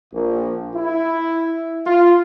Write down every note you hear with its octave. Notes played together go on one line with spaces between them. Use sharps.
A#1
E4
F4